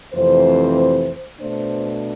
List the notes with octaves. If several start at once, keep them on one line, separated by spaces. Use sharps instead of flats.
F2 C3 E3 A3 C4 C5
B2 A3 D4 C5